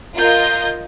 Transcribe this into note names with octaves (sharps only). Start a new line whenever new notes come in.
F4 A#4 D#5 G6